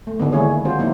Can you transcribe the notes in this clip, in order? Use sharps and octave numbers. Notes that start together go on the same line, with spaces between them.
A3
D3 D#3 B3
G#3 A#3 D4 E4 G#4 C#5
D#3
G#3 C4 F4 F#4 C5
F#3 A#3 D#4 E4